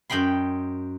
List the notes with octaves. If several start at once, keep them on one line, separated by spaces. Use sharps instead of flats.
F#2 D#5 G5 B5 C6